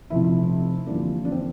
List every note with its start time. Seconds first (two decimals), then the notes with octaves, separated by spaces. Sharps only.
0.10 F1 F2 C3 E4
0.87 G1 F2 E3 G3 A#3 D4
1.25 D4
1.32 C4